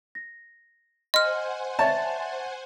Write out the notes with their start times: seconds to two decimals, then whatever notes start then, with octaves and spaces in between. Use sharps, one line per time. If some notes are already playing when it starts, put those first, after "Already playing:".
0.15 A#6
1.14 C5 D#5 F#5 G#5 C6 F6
1.79 C#5 D5 E5 A5 A6